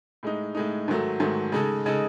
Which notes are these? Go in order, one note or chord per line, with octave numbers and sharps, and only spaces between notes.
A2 G#3 D#4
A2 G#3 D#4
G#2 D#3 F#3 A3
G#2 D#3 F#3 A3
C#3 G#3 D#4 A4
C#3 G#3 D#4 A4